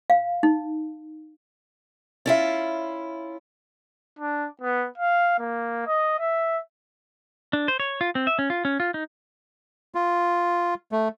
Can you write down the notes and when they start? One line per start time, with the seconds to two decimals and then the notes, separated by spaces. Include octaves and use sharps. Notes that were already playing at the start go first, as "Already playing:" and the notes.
0.10 F5
0.43 D#4
2.26 C#4 E4 F4 D5 E5
4.19 D4
4.62 B3
4.98 F5
5.39 A#3
5.87 D#5
6.19 E5
7.53 D4
7.68 C5
7.80 C#5
8.01 F4
8.15 C4
8.27 E5
8.39 C#4
8.50 F4
8.65 C#4
8.80 F4
8.94 D#4
9.95 F4
10.92 A3